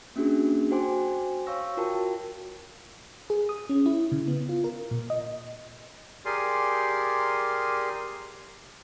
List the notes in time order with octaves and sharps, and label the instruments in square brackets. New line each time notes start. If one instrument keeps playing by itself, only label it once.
[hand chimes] A#3 C#4 D4 F#4 G#4
F#4 C5 G5 G#5 C6 D6
C#5 F5 C#6 E6 A#6
F4 F#4 A#4 G5 A5
[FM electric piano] G#4
D#6
C#4
E4
C#3
B3
F4
A#4
A#2
D#5
[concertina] G4 G#4 A#4 D5 G#5 C6